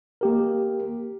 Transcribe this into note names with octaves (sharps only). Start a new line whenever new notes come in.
A#3 G4 A#4